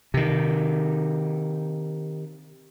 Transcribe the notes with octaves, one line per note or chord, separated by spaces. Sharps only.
C3 D#3